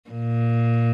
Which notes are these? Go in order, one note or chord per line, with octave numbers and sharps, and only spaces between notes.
A#2